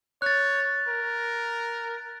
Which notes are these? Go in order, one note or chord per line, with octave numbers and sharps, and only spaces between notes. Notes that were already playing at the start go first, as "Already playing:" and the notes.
C#5 F#6 A6
A#4